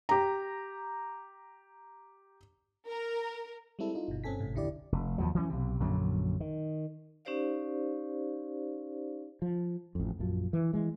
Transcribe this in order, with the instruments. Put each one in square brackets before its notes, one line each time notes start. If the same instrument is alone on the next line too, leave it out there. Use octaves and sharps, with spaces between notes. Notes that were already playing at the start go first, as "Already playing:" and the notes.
[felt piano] G4 A#5
[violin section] A#4
[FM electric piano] G3 G#3 C4 E4 A4
D#4 F4
G1 B2
G2 C4 C#4 A4 G#5 B6
G#1 A2 C3
A#1 E2 D3 E4 G4 D5
[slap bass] F1
D#2 F3 F#3
E3 F#3 B3 C#4
B1 C3
A#1 F#2 D3 F#3
D#3
[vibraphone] C#4 D#4 G4 C5 D5 F5
[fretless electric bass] F3
A1 F2
A#1 F#2 F3
E3
E3 G#3